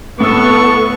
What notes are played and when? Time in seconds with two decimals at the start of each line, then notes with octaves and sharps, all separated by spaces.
0.20 A2 B3 A4 C#6 E6